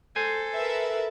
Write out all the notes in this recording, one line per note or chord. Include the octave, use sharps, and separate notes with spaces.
A4 C5 G#5
A#4 B4 E5